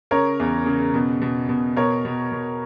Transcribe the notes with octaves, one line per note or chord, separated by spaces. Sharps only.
C#3 A#4 C#5
E2
C#3
B2
B2
B2
B2 A#4 C#5
B2
B2